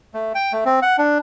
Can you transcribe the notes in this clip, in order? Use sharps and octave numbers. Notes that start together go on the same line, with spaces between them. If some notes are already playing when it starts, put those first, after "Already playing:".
A3
G5
A3
C4
F#5
D4